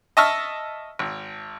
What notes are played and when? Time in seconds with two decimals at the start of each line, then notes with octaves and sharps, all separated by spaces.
0.17 D#5 E5 A5 C#6 E6 F6
0.99 G#1